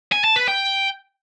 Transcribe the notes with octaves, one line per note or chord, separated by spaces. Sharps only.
G#5
A5
B4
G5